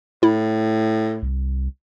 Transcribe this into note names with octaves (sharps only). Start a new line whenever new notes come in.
A2 E4
C2